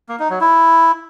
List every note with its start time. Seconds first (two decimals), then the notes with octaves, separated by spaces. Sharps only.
0.09 A#3
0.19 D#4
0.30 F#3
0.41 E4